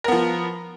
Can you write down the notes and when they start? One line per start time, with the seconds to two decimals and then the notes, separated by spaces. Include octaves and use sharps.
0.04 A#4
0.08 B3
0.12 F3